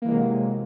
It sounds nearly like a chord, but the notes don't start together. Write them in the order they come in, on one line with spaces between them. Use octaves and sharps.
A#3 E3 G#3 C3 F#3